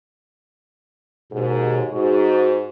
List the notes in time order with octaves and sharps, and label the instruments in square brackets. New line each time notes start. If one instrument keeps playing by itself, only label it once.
[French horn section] D#2 G#2 [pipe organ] B2
[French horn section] G#2 [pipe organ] F#4